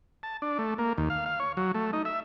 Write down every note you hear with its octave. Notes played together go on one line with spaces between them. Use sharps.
A5
D4
A3
A#3
D#2
F5
F5
C#5
F#3
A3
D#4
E5